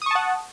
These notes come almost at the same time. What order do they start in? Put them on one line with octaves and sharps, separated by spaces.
D#6 C#6 A5 F#5